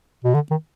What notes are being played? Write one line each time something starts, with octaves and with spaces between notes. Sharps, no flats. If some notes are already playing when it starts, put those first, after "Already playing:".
B2
D3
D#3